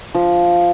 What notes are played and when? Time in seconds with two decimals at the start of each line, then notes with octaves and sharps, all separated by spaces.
0.15 F3